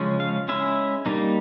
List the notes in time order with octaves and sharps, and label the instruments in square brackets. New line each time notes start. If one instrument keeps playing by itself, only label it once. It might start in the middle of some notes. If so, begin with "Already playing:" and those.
Already playing: [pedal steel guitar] C#3 F3 G#3 C#4
F5
G#3 C#4 E4 E5
G3 A#3 D#4